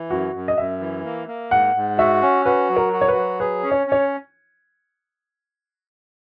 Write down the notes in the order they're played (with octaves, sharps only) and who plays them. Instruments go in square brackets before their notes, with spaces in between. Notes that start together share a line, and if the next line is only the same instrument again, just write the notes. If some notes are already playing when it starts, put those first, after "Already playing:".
Already playing: [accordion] E3
[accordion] F#2 [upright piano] F#4
[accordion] F#2
[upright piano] D#5
[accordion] F#2 [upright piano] E5
[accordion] E3
A#3
A#3
[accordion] G#2 [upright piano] F#5
[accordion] G#2
[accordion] F#4 [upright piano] E5
[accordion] C#4
[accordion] F#4 [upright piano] B4
[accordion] F#3
[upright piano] A#4
[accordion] F#4
[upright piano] C#5
B4
[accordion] F#3
[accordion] G#4 [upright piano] B4
[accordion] C#4
[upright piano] C#5
[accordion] C#4
[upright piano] C#5